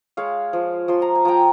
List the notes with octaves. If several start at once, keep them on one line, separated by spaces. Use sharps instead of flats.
G#3 C#5 F5
F3
F3 C6
A#5
G#5
F3 G5 A#5